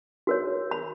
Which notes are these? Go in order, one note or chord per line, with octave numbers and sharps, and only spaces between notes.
F#4 A#4 C#5
B5